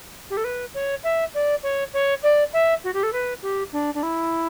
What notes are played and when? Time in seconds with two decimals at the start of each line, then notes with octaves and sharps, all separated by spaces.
0.30 G4
0.37 A4
0.44 B4
0.74 C#5
1.04 E5
1.34 D5
1.63 C#5
1.93 C#5
2.23 D5
2.53 E5
2.84 F#4
2.93 G4
3.03 A4
3.13 B4
3.42 G4
3.73 D4
3.94 D4
4.03 E4